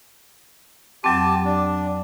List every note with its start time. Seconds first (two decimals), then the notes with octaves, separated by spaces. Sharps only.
1.04 F2 F#3 C4 G4 A5
1.45 D4